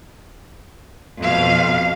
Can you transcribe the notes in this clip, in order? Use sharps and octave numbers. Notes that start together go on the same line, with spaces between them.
F2 B2 F5